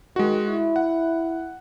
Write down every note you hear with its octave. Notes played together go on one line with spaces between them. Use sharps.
D#3 G#3 F#4
E4
F#5